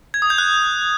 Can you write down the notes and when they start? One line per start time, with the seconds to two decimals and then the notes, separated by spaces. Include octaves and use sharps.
0.14 G#6
0.22 D#6
0.30 G6
0.38 F#6